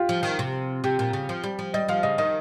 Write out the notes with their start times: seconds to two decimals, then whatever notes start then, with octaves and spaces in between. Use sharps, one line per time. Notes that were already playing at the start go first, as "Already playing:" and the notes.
Already playing: F4 G4
0.09 F3
0.23 D#3
0.39 C3
0.84 C3 G4
0.99 A#2
1.13 C#3
1.29 F3
1.44 G3
1.59 F3
1.74 G3 D#5
1.89 F3 F5
2.03 C#3 D#5
2.18 D#3 D#5